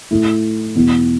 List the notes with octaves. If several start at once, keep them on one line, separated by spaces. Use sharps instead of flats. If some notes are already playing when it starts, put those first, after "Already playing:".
A2 A3 E4
E2 B2 B3